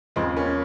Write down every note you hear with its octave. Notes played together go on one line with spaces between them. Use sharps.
D#2 C#3 F3 G#3 C4
A#3 C#4